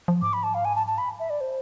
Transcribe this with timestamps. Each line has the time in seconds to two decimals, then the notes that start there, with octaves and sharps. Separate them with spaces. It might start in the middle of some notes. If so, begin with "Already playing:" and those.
0.08 F3
0.22 G#2 D6
0.33 B5
0.43 A5
0.55 F5
0.65 G#5
0.76 A5
0.87 A5
0.98 B5
1.20 E5
1.30 D5
1.41 C5